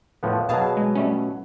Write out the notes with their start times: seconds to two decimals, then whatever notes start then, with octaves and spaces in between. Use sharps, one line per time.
0.23 A2 F3 B3
0.49 B2 F#3 G#4 F5 A5
0.77 G#3
0.95 G3 A3 C#4